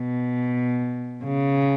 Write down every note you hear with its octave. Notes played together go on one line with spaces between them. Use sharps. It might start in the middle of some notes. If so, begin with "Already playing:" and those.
Already playing: B2
C#3